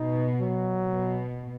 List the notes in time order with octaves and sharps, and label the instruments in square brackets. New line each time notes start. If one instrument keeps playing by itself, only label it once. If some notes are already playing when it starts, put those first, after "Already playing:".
Already playing: [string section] B2 [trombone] D#4
[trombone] F#3
[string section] B2